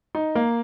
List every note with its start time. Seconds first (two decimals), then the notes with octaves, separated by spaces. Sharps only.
0.15 D#4
0.35 A#3